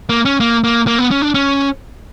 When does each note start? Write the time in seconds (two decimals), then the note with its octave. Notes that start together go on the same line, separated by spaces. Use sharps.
0.09 A#3
0.25 C#4
0.40 A#3
0.64 A#3
0.87 A#3
0.98 B3
1.11 C#4
1.22 D4
1.34 C#4